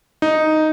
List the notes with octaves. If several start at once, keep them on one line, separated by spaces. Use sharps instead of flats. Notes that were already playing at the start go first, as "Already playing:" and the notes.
D#4